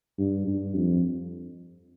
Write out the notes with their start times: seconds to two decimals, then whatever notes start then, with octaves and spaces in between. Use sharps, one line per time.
0.19 G2
0.47 G2
0.76 F2